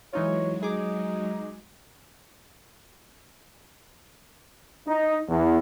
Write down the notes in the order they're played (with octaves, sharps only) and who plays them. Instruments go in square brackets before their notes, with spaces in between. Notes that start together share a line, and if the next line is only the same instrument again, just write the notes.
[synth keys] E3 D#4 F4 [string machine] F#3 G#3 [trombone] C#5
[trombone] D#4 [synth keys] G#4 D6
[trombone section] D#4
E2